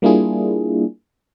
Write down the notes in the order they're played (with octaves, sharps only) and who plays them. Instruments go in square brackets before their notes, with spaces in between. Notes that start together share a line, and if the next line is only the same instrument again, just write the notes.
[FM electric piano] G3 A#3 D4 E4 F4 G#4